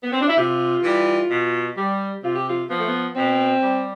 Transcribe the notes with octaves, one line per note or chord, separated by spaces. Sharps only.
B3
C4
D4
E4
C3 F4
E3 G3
B2
G3
C3 F4
G4
F4
F3 B3
A3
B3
B2 C4
G3